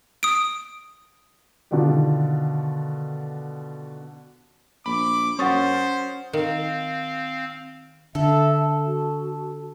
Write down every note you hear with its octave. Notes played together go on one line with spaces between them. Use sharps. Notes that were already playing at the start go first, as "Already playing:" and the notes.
D#6 D7
B2 D3 D#3 F4 G4
A#1 B5 D6
F#2 C#4 C5 F#5 C#6 D#6 A6
D#3 C4 F5
D3 A4 E5
F#4